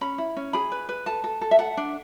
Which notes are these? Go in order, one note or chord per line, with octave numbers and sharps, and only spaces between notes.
C#4 B5
E4
C#4
G#4 B5
B4
B4
A4 A5
A4
A4
E5
A4 F#5
D4